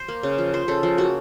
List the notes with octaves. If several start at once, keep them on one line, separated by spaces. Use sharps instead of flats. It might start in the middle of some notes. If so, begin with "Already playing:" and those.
Already playing: C5
A#3
C#3
F3
F3 C5
C#3 A4
F3
A#3 F#4